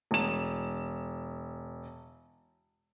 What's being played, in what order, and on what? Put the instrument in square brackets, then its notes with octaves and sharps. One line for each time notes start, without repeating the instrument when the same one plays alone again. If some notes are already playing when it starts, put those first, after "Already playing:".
[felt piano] E1 E7